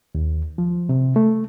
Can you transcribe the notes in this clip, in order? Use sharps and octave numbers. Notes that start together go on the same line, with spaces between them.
D#2
F3
C3
A3